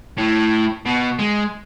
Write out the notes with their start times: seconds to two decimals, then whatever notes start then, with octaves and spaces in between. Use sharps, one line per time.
0.18 A2
0.85 B2
1.19 G#3